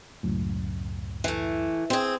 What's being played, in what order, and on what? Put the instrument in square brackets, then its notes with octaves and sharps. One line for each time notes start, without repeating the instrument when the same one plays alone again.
[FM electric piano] C#2 F#2 A2
[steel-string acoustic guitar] E3 A3
C4 G#4